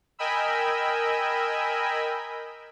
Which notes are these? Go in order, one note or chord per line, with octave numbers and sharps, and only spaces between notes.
A#4 D#5 G5 G#5 B5 E6